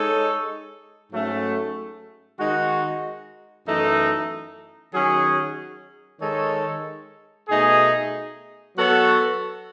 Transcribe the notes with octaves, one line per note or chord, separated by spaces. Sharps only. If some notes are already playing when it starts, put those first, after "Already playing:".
Already playing: G#3 D#4 A4 C#5
G#2 F#3 A3 C#4
D#3 G#3 D#4 F#4
F#2 E3 A3 D#4
D#3 F#3 C#4 G#4
D#3 G#3 D#4 A4 C#5
B2 A3 D#4 G#4
F#3 B3 F#4 A4 C#5